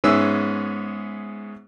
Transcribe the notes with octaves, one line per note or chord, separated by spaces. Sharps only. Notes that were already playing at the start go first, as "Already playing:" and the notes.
G#2 B3 C#4 G#4 E5 E6